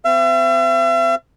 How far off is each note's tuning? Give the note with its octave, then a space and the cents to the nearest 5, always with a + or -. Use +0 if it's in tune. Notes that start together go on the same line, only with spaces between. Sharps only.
C4 -35 E5 +45